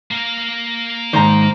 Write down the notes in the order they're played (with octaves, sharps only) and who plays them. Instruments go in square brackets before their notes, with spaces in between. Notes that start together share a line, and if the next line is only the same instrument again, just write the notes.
[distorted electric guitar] A#3 F5
[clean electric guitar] G#2 D#3 [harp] C5 A#5